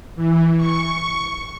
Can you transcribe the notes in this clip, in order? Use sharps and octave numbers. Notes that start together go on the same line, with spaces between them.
E3
C#6